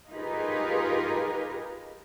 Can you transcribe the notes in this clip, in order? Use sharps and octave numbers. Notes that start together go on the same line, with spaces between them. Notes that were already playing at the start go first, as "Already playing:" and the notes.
D#4 F4 G4 G#4 A#4 B4